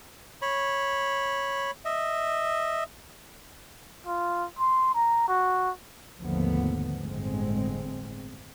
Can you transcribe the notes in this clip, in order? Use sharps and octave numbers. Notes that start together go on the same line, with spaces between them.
C#5 B5
D#5 E5
F4
C6
A#5
F#4
G#1 D#2 D3 F3 A3 B3
G1 E2 A2 D3 G#3 C4